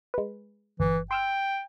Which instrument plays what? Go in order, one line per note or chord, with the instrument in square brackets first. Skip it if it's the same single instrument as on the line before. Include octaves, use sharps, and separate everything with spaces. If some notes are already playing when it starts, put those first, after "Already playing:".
[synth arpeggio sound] G#3 B4
[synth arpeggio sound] G1 [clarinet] E3
[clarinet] G5 [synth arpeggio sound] C6 E6 F6